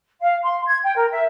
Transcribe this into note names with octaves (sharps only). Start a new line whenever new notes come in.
F5
C6
G#6
G5
A#4
E5